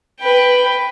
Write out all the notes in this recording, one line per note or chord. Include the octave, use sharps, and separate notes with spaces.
B4 G5